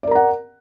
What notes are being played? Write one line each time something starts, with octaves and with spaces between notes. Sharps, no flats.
A#4 D5 F#5 A#5